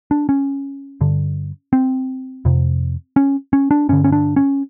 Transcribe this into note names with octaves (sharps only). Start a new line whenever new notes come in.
D4
C#4
G2 D3
C4
F2 C3
C#4
C#4
D4
G2 D3 C#4
C#4
D4
C#4